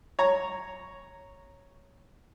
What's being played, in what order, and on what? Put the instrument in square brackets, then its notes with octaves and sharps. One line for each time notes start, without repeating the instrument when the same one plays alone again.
[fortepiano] C#5 A#5